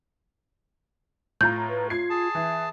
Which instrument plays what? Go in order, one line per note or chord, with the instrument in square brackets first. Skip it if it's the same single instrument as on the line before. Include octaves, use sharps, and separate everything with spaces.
[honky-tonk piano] A2 F4 A#5 [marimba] G6
[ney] B4
[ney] F4 [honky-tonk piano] G#6 C7
[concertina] G#4 A5
[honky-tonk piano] E3 [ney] E5